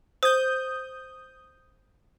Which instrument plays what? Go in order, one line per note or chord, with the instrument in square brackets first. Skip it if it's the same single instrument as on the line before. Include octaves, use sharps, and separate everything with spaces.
[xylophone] C5 [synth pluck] D#6 G6